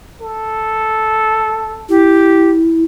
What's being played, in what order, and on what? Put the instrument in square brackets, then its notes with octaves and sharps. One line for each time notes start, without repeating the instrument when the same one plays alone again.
[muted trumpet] A4
[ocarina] E4 [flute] G4